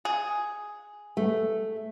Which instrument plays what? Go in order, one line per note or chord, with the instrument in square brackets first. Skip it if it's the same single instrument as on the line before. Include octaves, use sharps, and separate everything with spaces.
[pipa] G#4
[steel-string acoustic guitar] A3